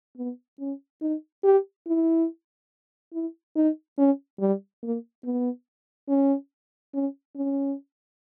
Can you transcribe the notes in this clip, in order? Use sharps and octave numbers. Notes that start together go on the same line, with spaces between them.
B3
C#4
D#4
G4
E4
E4
D#4
C#4
G3
A#3
B3
C#4
C#4
C#4